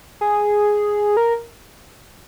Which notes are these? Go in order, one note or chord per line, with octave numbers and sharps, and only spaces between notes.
G#4
A#4